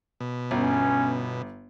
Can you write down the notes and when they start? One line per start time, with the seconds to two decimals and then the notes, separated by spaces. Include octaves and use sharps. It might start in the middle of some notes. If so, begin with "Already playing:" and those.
0.20 B2
0.51 G1 C#4